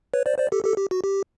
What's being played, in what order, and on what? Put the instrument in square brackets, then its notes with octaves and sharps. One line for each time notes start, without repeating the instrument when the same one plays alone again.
[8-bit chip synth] B4 C#5
C5 D5
C5 D5
G4 A4
G4 A4
G4
F#4
G4